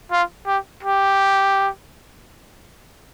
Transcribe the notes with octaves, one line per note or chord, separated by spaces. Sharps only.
F4
G4
G4